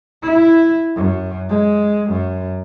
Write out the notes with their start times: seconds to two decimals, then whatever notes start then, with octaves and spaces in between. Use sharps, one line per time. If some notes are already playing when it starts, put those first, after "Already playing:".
0.22 E4
0.95 F#2
1.49 G#3
2.10 F#2